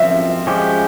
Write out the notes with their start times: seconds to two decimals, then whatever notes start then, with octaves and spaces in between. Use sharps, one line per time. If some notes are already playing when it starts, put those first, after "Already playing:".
Already playing: F3 C4 F4 A#4 E5
0.47 F3 G#3 C#4 G4 C5